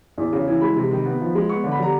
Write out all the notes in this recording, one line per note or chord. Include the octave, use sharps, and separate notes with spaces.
E2
C#3
E3
G#3 B5
C3
D#3
B3
F3
G#3
B3 C#6
D3
B5
G3 A#5